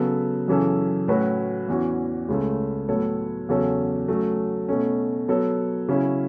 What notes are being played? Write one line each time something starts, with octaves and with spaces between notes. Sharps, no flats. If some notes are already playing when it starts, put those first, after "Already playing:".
Already playing: C#3 F#3 B3 A4
F#2 C#3 E3 C#4 A4
A2 F#3 C#4 F#4 B4
E2 E3 C#4 F#4
C#2 C#3 A3
A2 F#3 B3 A4 C#5
E2 C#3 F#3 C#4 A4
F#3 A3 C#4
B2 A3 C#4
F#3 B3 A4 C#5
C#3 F#3 C#4 E4